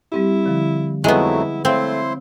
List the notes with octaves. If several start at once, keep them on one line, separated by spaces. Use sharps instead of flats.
G3 C4 E4 G4
D3 F3
F2 F#3 G#3 A3 B3 E4
A3 C4 E4 C5 C#5 F5 C6